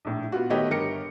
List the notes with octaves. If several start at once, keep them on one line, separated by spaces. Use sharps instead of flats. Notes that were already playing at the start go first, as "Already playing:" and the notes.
A#1 A2
B3 F4 F#4
D#3 A3 B3 G4 C#5 D#5
G1 G4 A#4 A#6 C#7